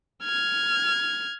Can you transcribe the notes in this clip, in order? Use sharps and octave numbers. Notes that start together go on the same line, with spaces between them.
F6 G#6